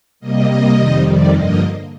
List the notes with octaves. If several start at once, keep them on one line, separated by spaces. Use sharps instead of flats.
C3 G3 A#3 D#5
C3 G3 A#3
F2 C3 D#3 G3
F2 C3 D#3 G3 D5
G2 D3 F3 A#3 D#5